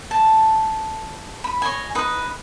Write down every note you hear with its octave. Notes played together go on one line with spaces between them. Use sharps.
A5
B5
C#5 D#5 G#5
D#4 B4 D#6